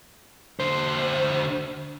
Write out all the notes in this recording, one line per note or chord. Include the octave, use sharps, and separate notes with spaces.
D3 C5